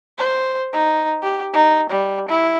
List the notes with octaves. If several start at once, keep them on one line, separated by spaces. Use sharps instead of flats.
C5
D#4
G4
D#4
G3
E4